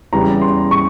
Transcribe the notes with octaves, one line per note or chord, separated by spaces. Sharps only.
E2 C#3 E3 G3 A#5
C6
C#6